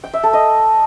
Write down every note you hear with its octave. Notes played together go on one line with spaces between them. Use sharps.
G5
E5
A4
D#5